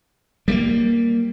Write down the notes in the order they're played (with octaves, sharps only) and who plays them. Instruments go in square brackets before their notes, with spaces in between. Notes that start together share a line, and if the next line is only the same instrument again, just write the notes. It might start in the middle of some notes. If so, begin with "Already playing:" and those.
[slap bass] G3 A3 A#3